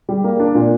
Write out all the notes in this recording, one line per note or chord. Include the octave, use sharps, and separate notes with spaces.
G3
A#3
D4
A#2